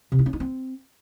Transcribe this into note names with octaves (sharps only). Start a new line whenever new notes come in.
C3
E4
C#4
D#4
C4